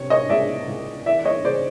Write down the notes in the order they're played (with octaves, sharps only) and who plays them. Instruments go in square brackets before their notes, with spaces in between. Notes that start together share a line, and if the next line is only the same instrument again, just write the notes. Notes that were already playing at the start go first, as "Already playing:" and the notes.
Already playing: [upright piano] C3 C#5
C#5 D#5
C#2 D5 E5
C#2
E3 D5 E5
C#5 D#5
C#3 C5 D5